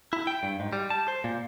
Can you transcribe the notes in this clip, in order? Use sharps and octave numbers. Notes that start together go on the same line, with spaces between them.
E4
G5
G2
G#2
G3
A5
C5
A#2